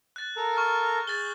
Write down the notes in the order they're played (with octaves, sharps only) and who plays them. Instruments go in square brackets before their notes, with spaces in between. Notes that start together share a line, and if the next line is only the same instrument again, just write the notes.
[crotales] F#6 A6
[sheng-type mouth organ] A4 A#4 A#5
[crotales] C#6 F6
[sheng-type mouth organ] G#4 F#6 G6 [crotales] A6 G7